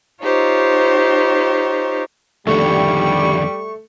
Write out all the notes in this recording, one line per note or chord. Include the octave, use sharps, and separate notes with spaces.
D#4 F4 G4 C5 C#5
F2 D3 D#3 G3 A3 C#6